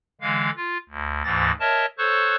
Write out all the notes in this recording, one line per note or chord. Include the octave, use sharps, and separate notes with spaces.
D3 E3 G#3 F5
F4
D2
D2 G#2 E3 A6 A#6
A#4 C#5 D#5 E5 A5
A4 C5 C#5 C#6 F#6